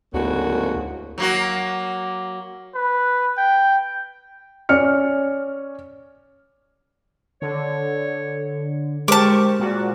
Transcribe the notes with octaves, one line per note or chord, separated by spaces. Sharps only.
D1 D2 G#2 C#3 A#3 F#4
F#3 A#3 F#4
B4
G5
C#4 D5 F6 C#7
D3 C#5
G#3 G4 A#4 C5 A5 C#6 D6
A#2 G3 F#4